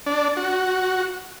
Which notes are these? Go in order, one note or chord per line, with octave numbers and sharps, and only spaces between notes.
D4
F#4